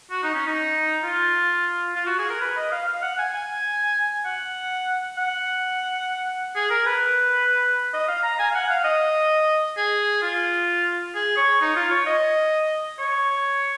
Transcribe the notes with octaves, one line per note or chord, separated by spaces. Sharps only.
F#4
D#4
C#4
D#4
F4
F4
F#4
G#4
A#4
B4
D#5
F5
F5
F#5
G#5
G#5
F#5
F#5
G#4
A#4
B4
D#5
F5
A#5
G#5
F5
F#5
F5
D#5
G#4
F4
G#4
C#5
D#4
F4
C#5
D#5
C#5